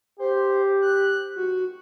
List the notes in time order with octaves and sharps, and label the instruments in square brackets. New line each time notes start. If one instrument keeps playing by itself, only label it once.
[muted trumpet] G4 [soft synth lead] C5
[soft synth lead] F#6
F#4